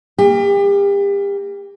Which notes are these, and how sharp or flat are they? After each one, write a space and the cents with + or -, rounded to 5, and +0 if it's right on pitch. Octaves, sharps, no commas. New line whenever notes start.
A#3 -10 G4 +35